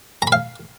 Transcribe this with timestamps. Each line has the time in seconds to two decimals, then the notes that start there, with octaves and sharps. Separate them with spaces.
0.22 A#5
0.27 B5
0.32 F5